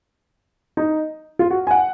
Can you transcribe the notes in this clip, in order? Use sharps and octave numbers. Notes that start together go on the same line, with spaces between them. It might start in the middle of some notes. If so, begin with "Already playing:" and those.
D#4
F4
F#4
G#5
F#5